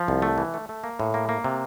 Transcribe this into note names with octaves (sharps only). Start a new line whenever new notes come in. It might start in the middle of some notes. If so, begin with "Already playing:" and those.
Already playing: F3
C2
A3
E3
A3
A3
A#3
A2
A#3
A#3
C3